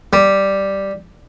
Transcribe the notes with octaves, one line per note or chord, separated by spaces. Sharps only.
G3